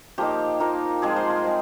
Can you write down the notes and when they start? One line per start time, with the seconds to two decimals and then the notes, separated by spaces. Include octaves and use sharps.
0.18 F3 A#3 D#4 G4
0.60 F3 A#3 D#4
1.02 F3 G#3 C4 G#4
1.16 C5
1.30 A#4
1.44 G#3 C4